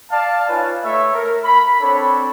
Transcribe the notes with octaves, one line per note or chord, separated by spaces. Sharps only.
D5 F5 A5
D#4 F4 B4 C#5 G#5
A3 C#5 E5
A#4
B5
C4 D4 A4 C#5 B5